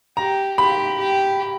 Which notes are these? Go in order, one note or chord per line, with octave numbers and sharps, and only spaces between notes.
G4 A#5
G4 B5
G4